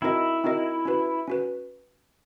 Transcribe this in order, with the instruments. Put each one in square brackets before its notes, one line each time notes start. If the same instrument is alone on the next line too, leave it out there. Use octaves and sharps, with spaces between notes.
[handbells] C4 D#4 F#4 A#4 D#5 [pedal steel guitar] E4
[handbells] C4 D#4 F#4 A#4 D#5
C#4 F#4 B4
C#4 F#4 B4